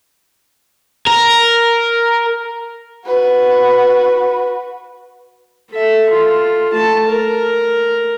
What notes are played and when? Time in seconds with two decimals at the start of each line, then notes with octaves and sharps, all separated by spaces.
1.07 A#4
3.06 F#4 B4
5.71 A4 E5
6.10 F4 A4
6.74 A3 A5
7.08 A#4